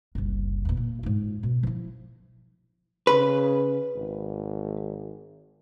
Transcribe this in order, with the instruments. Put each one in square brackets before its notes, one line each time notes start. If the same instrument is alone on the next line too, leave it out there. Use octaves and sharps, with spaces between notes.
[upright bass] F#1 C2
E2 A#2
A#2
G#2 F4
B2
F3 E4
[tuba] C#3 [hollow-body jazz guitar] B4
[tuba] G#1